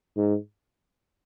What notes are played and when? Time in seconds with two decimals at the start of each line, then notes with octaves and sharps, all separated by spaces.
0.17 G#2